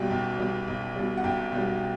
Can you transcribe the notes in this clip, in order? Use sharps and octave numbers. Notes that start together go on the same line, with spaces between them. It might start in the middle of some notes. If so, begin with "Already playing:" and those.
Already playing: B1 B2 G3 G5
B1
B2 G3
B1
B2 G3
F#5
B1 G5
B2 G3